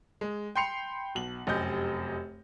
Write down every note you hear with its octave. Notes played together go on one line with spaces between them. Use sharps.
G#3
G5 B5 C6 C7 C#7 F7
B1 F#7
F1 F#2 G4 D#5 G6